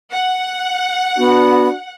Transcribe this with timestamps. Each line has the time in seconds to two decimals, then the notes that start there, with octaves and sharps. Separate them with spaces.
0.13 F#5
1.18 B3 D4 F#4